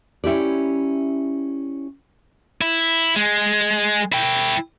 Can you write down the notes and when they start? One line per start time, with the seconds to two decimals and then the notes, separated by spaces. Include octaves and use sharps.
0.24 C#4 E4 G4 D5
2.61 E4
3.16 G#3
4.12 E4 G5